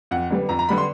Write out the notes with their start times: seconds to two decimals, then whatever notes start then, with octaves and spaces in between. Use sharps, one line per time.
0.11 F2 F#5
0.30 D3 G3 B3
0.49 F2 A#5
0.59 A#5
0.69 D3 G3 B3 B5
0.78 C6